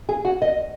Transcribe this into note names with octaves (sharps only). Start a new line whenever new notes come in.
G#4
F#4
D#5